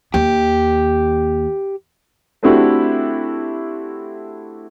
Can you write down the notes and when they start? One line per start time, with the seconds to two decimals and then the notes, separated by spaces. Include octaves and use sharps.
0.14 D#2 G4
2.43 A3 C4 D4 E4 F#4 G4